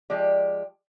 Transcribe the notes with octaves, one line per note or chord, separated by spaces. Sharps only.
F3 G#3 G4 D5